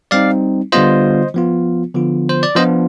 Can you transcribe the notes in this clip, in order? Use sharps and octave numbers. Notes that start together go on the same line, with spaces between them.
G3 C4 D#4 D5 F5
D3 G3 B3 F4 C5 D#5
F3 B3 F4
D3 F3 B3 F4
C5
D5
F3 B3 D4 F4 C5 D#5